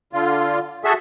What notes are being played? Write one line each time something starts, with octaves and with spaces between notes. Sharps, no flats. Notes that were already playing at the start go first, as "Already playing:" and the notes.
D3 F4
F#4 G#4 A4 E5